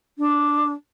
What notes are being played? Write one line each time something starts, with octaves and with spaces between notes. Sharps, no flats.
D4